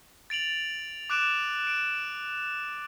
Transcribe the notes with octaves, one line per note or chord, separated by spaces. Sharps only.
A6 D7 F7 F#7
D6 F#6 D7 E7
D7